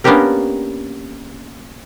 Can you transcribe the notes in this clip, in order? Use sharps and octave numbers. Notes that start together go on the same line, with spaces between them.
A#3 B3 C#4 D4 G4 A#4